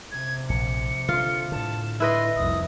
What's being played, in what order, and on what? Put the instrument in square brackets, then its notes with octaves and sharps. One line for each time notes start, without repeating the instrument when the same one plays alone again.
[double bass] C3 [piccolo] G#6
[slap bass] A#1 [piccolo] C#7
[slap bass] D3 [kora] F4
[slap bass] A2 D3 [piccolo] A5
[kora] E4 B4 D#5 [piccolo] C6
[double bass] F1 C2 [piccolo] D#6